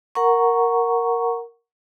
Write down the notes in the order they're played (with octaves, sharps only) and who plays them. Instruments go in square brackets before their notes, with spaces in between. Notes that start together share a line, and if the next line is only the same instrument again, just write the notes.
[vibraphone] A#4 F#5 A#5 C#6